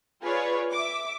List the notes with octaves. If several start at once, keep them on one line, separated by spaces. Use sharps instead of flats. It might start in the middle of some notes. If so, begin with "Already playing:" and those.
F4 G#4 B4 C#5 D5
E5 D6